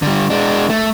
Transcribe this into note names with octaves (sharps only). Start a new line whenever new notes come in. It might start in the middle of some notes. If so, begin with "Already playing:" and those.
D3 G3
G#3 D4
A3